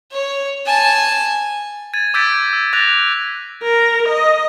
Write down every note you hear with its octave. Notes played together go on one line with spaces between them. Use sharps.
C#5
G#5 A5
G#6 A6 D#7
D6 E6 G6 A6 B6 D7
E6
D6 F#6 A6 A#6 F7
A#4
D#5